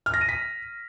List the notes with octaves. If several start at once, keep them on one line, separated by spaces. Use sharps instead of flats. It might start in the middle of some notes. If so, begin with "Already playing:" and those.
F6
A#6
D#7
B6